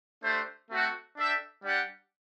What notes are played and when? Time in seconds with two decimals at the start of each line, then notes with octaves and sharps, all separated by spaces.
0.23 A3 D4 G4 C5
0.71 A3 C4 F#4 A4
1.17 D4 A4 E5 G5
1.64 G3 D4 G4 D5 F#5